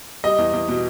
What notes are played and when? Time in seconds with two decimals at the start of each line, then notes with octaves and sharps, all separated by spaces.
0.24 G3 D#5
0.38 E2
0.53 E2
0.69 B2